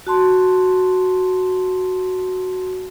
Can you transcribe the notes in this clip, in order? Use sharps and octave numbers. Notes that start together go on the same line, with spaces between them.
F#4 A5 C6